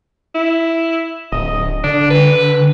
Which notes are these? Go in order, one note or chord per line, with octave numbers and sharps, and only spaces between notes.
E4
D1 D#5
D3 D4
B4